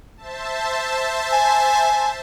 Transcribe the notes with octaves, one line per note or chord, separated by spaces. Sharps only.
C5 E5 A5
G#5